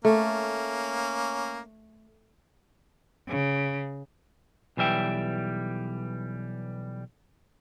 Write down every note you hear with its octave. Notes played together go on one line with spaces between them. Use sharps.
A3 A#3 C#4
C#3
B1 E3 G3 E5 G5